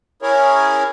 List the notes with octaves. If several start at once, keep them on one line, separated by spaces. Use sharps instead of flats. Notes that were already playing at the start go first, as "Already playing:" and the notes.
C#4 E4 G#4 A#4 C#5